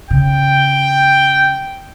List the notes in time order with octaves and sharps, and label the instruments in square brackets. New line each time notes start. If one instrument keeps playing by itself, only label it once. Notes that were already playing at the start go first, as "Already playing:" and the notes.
[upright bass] C#3 [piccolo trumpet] G5